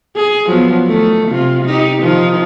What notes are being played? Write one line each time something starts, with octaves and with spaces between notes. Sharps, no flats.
G#4
F3 F#3 B3
D#3 A3
C3 F4
D#4 G4
D#3 F3 D#4